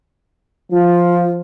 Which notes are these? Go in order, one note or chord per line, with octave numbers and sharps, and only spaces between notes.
F3 F4